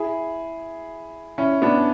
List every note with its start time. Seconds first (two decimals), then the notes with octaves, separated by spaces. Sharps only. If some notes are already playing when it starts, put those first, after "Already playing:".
Already playing: E4 G#4
1.38 C#4 E4
1.62 B3 D4